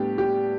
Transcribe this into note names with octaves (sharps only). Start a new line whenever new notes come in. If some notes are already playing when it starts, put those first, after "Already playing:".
Already playing: A2 G3 B3 D4 G4
G4